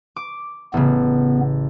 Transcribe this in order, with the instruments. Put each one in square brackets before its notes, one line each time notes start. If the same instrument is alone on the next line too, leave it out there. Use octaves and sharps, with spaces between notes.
[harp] D6
[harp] A1 C#3 [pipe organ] B3